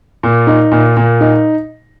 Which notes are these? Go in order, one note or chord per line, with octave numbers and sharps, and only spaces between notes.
A#2
D#4
A#2
A#2
D#4